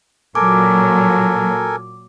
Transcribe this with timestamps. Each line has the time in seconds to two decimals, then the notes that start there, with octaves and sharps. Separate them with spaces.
0.35 A#2 F#3 A4 A#4 G#5 D6